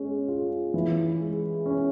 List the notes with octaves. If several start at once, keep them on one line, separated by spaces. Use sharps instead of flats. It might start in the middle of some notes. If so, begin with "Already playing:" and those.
Already playing: G#3 C#4
F4
E3
G#3
C#4